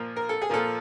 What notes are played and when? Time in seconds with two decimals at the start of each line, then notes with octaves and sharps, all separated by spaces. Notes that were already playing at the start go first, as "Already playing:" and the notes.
Already playing: A#2 F3 A#3
0.16 A#4
0.29 A4
0.42 G#4
0.49 A#2 F3 A#3 A4